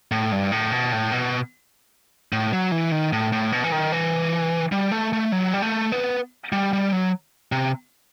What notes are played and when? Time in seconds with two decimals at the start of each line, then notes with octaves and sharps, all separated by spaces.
0.12 A2
0.32 G2
0.52 A2
0.72 B2
0.92 A2
1.12 B2
2.32 A2
2.53 F#3
2.72 E3
2.91 D#3
3.13 A2
3.32 A2
3.52 B2
3.64 E3
3.72 D#3
3.92 E3
4.72 G3
4.92 A3
5.13 A3
5.32 F#3
5.54 G3
5.62 A3
5.92 B3
6.52 G3
6.73 G3
6.92 F#3
7.52 C3